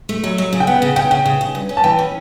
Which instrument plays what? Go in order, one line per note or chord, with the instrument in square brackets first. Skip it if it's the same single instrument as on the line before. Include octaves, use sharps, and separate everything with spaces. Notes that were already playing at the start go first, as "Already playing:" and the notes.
[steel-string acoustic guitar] A3
F#3
F#3
C#3
[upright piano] G5
[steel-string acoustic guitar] B3 [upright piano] F#5
[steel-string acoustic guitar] C#3
[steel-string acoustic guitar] C#3 [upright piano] G5
[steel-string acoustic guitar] C#3 [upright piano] G5
[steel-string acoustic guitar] C#3
C#3
G2
C#4
[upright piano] A5
[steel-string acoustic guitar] E3 [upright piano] G5
[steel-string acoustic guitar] C#4